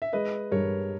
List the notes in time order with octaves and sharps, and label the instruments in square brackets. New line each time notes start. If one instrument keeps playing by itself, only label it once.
[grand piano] E5
[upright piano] G#3 [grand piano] B4 D#5
[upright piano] G2 [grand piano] A#4 C#5